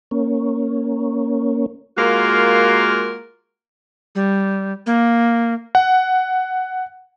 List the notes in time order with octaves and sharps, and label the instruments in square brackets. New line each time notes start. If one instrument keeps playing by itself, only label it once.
[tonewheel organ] A#3 C#4
[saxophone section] G#3 A#3 F4 F#4 A#4
[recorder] G3
A#3
[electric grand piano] F#5